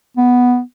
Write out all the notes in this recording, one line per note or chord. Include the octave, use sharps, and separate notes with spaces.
B3